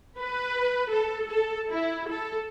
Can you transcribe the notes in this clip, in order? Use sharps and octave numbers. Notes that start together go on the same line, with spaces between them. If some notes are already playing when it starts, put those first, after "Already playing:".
B4
A4
A4
E4
A4